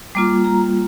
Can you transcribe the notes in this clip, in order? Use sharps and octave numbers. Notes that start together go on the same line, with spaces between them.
G3 A#3 F4 D6
A#5